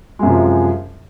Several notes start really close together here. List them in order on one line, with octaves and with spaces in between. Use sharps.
G#3 F#2 C3 F3